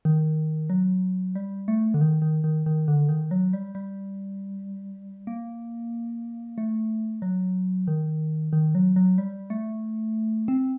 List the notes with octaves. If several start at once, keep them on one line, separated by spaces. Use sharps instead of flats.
D#3
F#3
G3
A3
D3
D#3
D#3
D#3
D#3
D3
D#3
F#3
G3
G3
A#3
A3
F#3
D#3
D#3
F#3
F#3
G3
A3
C4